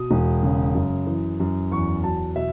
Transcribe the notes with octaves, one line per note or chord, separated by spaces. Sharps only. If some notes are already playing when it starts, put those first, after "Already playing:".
Already playing: B2 D#6
E1
C#3
F#2
E3
F#2
E2 C#6
F#3 A5
B2 E5